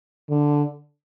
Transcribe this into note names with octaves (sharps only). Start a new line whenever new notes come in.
D3